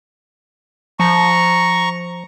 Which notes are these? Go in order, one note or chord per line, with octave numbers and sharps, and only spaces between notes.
F3 A#5 C#6